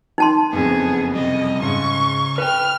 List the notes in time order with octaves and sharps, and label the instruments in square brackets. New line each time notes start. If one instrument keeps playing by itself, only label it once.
[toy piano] D#4 A5 C6
[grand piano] F#1 F2 [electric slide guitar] B3 [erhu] G#4
[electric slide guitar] C3 G3 [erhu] D#5
[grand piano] G#2 [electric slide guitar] C#3 [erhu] C#6
[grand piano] B4 G5 [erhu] F6